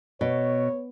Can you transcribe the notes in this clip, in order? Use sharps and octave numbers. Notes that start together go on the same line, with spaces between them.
B2 C#5